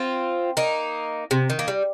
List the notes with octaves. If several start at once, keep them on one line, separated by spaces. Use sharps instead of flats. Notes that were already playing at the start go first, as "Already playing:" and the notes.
Already playing: C4 F4
A#3 D#4
C3
D#3
A#3
G3